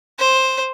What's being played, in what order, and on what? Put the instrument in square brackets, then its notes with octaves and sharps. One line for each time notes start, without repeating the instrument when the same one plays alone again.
[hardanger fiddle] C5